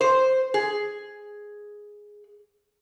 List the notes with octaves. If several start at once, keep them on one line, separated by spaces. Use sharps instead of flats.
C5
G#4